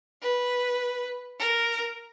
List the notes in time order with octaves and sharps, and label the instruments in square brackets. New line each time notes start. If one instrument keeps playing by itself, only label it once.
[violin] B4
A#4